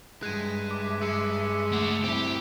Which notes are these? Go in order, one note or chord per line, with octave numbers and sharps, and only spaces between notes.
G2 G#3 E5 F#6 G#6 D#7
D6
G#3 E6 F#6 C#7
A3 F#5
C4 E4 G4